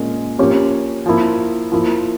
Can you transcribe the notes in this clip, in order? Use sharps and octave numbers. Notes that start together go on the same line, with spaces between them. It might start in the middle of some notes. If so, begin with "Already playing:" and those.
Already playing: A#2 G#3 C#4
F3 A#3 C#4 G4 C#5
F3 A#3 E4
F3 A#3 E4